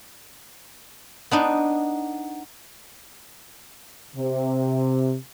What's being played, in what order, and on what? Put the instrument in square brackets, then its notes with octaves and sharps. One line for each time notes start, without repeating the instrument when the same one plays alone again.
[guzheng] B3 D4 D#4
[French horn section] C3